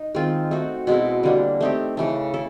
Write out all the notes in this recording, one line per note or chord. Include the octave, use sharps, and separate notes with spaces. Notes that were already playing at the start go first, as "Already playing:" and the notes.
Already playing: D#4
D#3 G#3 C4 F4
A3 C4 D#4 F#4
B2 G#3 C4 E4
D3 G3 A#3 D4
A3 C4 D#4 G4
C#3 E3 A3
E4 A4